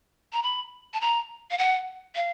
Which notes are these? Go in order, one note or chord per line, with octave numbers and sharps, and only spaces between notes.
A#5
B5
A5
A#5
F5
F#5
F5